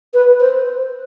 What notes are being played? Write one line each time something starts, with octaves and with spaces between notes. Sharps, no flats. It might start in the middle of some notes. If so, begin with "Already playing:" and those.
B4
C5